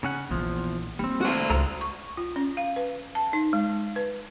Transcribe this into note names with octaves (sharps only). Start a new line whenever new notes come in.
C#3 C#4 F#5
A#1 E2 E3 F3
G3 A#3 C4 D4
F#4 C5
C#2 A2 A4 A#5
C#6
F4
C#4
F5
B4
A5
D#4
G#3
B4